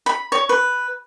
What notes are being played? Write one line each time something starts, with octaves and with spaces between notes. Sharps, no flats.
B5
C#5
B4